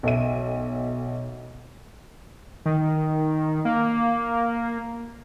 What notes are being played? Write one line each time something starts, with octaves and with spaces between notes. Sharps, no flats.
B1 A4 E5 D#7
D#3
A#3